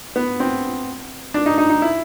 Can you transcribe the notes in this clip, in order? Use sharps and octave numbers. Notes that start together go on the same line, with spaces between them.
B3
C4
D4
D#4
D#4
D#4
E4